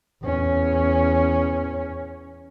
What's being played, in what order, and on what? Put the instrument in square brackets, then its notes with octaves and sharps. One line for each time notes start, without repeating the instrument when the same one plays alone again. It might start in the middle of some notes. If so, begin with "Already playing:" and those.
[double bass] E2 C#4